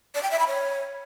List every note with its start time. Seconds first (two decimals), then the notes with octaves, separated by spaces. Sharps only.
0.15 D5
0.23 G5
0.31 E5
0.39 B5
0.47 C#5